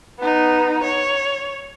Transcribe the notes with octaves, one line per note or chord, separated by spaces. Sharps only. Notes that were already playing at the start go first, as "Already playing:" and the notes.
B3 D#4
C#5